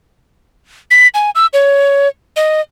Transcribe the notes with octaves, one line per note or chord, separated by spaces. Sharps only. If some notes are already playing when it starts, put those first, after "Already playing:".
B6
G#5
E6
C#5
D#5